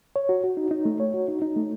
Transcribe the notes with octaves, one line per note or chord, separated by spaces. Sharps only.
C#5
F#4
F#4
D#4
D#4
A3
C#5
F#4
D#4
D#4
A3